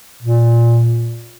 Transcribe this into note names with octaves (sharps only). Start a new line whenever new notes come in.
A#2